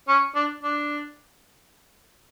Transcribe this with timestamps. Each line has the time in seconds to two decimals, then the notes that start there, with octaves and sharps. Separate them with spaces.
0.08 C#4
0.35 D4
0.64 D4